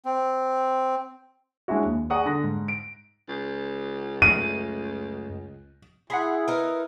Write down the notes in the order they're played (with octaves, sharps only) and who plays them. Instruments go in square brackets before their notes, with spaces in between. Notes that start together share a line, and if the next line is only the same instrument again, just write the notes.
[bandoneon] C4
[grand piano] G#3 C#4 D4 E4 F#4
D#2
G#4 D5 F#5 A#5 C#6 D#6
D3 A#6
G#2
D7
[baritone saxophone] C#2
[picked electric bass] F#2 A3 [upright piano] D#7
[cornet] E4 [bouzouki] G#4 [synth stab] F#5 B5 C6
[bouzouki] D#4 A#4 [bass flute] B4